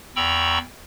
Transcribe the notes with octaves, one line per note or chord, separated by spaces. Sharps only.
E2 G5 A#5 B5 C#6 E6